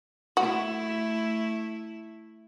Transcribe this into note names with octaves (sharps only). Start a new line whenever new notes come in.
A3 E4 F#4